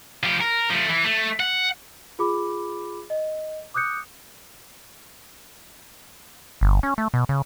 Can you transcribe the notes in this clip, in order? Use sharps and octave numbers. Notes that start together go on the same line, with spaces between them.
F3 G4
A#4
F3 A3
E3
A3
F#5
F4 G#4 B5 D6
D#5
D6 D#6 F#6 G6 C#7
G1
C#4
A3
B2
C#3